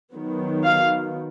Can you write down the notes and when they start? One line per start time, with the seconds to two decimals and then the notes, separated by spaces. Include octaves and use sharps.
0.13 D#3 F#3 B3
0.65 F5